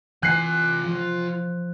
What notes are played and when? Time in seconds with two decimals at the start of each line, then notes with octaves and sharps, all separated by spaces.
0.23 E3 F4 G#5 F#6 C7
0.84 F3